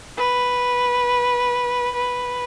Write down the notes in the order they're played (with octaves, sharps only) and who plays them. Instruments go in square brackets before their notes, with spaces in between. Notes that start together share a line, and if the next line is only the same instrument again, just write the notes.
[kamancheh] B4
B4